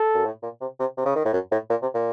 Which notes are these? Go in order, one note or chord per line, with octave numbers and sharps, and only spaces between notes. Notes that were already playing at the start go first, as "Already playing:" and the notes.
Already playing: A4
F#2
A2
A#2
C3
C3
C3
C#3
D#3
A2
F#2
A2
A#2
C3
A#2